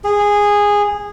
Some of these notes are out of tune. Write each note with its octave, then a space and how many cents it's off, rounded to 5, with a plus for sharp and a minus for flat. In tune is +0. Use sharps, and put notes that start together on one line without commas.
G#4 -15